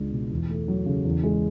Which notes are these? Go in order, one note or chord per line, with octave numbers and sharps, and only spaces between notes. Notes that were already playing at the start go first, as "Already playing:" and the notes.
Already playing: C#2 G#3 D4
B2
E2
A3
F#3
C#3
E2
G#3